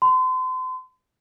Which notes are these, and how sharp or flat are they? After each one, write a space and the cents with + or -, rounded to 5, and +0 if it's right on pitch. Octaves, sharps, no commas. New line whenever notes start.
C6 -35